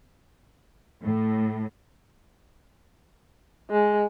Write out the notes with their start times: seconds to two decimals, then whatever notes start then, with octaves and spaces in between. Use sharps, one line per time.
1.02 A2
3.70 G#3